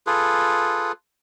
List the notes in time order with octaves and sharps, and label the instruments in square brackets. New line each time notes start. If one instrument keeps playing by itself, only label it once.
[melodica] F4 G#4 A4 B4